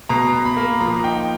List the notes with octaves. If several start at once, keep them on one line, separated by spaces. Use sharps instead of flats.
B2 A#5
B2
B5
A#3
F3 A#5
D#4 G5